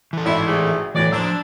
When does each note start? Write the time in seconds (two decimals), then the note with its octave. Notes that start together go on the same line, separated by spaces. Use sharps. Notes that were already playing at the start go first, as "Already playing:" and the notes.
0.13 E3 A4
0.25 G#1 D#4 E4 E5
0.47 C3 A3 G#4
0.95 D2 A2 E3 F#3 D5
1.12 F3 D4 C5 A#5 E6